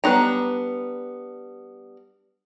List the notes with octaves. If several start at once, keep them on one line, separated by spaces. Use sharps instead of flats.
G3 B3 D4 D#4 A#5